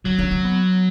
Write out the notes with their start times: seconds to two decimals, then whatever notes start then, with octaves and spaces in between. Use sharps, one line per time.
0.05 F#3 C#4
0.19 C#4
0.31 C#4
0.44 B3